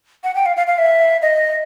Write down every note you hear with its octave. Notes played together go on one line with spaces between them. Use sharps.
F#5
G5
F5
F5
F5
E5
D#5